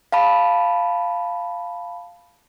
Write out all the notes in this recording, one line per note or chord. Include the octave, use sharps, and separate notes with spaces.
F5 A5 B5